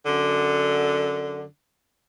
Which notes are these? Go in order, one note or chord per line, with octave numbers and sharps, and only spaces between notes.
F#2 D3